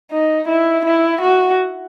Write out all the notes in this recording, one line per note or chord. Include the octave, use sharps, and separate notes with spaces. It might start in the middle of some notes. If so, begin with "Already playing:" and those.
D#4
E4
E4
F#4